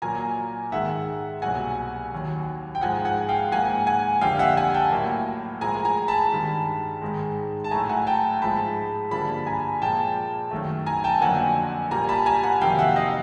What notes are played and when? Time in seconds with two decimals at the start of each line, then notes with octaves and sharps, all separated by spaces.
0.02 A#2 F#3 A#3 G#5 A#5
0.72 G#2 D#3 G#3 E5 F#5
1.42 C2 B2 F#3 A#3 F#5 G#5
2.12 D#2 D#3 F#3
2.75 G5
2.81 G#2 F3 G#3 F#5 G#5
3.05 F#5 G#5
3.29 F5 G5
3.52 G#2 F3 A#3 F#5 G#5
3.87 F#5 G#5
4.21 F2 D3 G3 A#3 F5 G5
4.39 E5 F#5
4.57 F#5 G#5
4.74 G5 A5
4.92 A2 F#3 A#3
5.61 A2 F3 G#3 G#5 A#5
5.85 G#5 A#5
6.08 A5 B5
6.32 G2 D#3 G#3
7.02 G#2 D#3 G#3
7.64 A5
7.71 A2 F#3 A3 G#5 A#5
7.89 F#5 G#5
8.07 G5 A5
8.42 G#2 F3 G#3 A5 B5
9.11 G2 D3 F3 A#3 A5 B5
9.47 G#5 A#5
9.81 A#2 F3 G#3 G5 A5
10.51 F#2 D#3 F#3 A3
10.86 G#5 A#5
11.04 G5 A5
11.21 F2 D3 F#3 A#3 F#5 G#5
11.91 A#2 G3 A#3 G#5 A#5
12.09 A5 B5
12.26 G#5 A#5
12.43 F#5 G#5
12.61 F2 C3 D#3 F#3 A#3 F5 G5
12.79 E5 F#5
12.96 D#5 F5